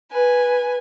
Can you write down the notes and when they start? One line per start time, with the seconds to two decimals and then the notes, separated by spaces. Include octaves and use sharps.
0.11 B4 G#5